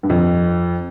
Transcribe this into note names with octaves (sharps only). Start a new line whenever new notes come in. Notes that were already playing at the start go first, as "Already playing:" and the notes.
G2
F2